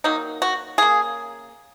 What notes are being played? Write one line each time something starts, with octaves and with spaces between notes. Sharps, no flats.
D#3 F#3 A#3 D#4
F#4
C#3 A#3 G#4